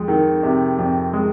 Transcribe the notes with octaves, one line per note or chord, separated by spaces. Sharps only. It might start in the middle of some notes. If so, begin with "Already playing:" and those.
Already playing: F2 G#3
D#3
C3
F2
G#3